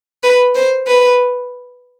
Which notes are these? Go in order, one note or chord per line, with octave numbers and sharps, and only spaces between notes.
B4
C5
B4